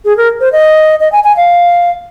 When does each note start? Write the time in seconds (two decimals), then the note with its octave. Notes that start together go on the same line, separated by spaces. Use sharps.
0.05 G#4
0.17 A#4
0.40 C5
0.52 D#5
1.00 D#5
1.12 G#5
1.24 G#5
1.37 F5